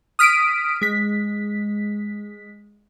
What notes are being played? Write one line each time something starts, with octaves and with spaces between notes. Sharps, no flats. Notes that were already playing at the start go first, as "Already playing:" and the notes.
D#6 F6 B6 D7 D#7
G#3 B6